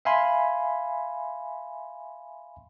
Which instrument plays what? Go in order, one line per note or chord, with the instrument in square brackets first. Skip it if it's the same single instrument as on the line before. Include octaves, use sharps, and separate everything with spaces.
[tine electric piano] E5 F5 G#5 B5 C6